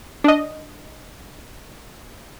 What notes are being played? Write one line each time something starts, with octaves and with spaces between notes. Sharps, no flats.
D4 D#5